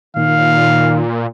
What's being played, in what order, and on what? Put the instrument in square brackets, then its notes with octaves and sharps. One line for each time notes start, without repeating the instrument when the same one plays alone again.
[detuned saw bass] A#2 [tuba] D#3 [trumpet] F5